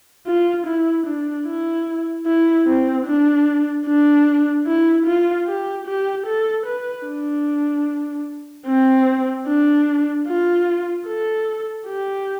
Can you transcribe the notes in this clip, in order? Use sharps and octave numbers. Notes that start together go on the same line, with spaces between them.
F4
E4
D4
E4
E4
C4
D4
D4
E4
F4
G4
G4
A4
B4
D4
C4
D4
F4
A4
G4